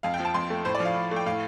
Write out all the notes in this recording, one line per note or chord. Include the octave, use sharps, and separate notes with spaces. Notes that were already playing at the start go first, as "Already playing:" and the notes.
F2 F5
G5
F3
A5
F2 C6
A3
A2 C5
D5
F3
F5
A2
A3
G5
A2 F5